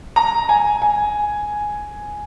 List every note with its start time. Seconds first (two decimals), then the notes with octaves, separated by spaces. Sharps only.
0.16 A#5
0.49 G#5
0.82 G#5